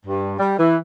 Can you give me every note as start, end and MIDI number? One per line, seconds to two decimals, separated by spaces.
0.06 0.33 43
0.39 0.55 55
0.59 0.76 52